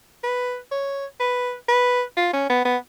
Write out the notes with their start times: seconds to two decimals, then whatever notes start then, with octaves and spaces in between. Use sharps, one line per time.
0.23 B4
0.72 C#5
1.20 B4
1.68 B4
2.17 F4
2.33 C#4
2.49 B3
2.65 B3